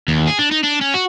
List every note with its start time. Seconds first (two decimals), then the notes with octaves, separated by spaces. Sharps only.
0.08 D#2
0.28 G#4
0.39 D4
0.52 D#4
0.64 D4
0.81 C#4
0.94 F#4